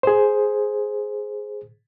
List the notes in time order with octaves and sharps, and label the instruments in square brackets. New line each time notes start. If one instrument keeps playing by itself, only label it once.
[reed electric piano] G#4 C5